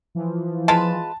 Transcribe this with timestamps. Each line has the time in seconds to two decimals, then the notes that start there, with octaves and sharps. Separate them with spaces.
0.15 E3 F3
0.68 G#3 F4 B4 A5